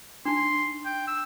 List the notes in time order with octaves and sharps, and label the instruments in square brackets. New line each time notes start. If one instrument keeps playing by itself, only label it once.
[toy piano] D4 D#4 [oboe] C6
[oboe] G5
E6